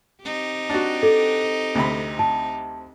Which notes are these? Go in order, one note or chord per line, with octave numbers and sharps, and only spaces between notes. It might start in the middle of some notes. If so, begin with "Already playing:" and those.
C4 D#4 G4
D4 F#4
A4
D2 C3 B5
A5